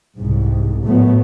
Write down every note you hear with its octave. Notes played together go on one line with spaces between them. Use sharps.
C2 G#2
A2 F#3 A3 B3